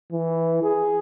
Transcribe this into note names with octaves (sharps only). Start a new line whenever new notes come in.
E3
G#4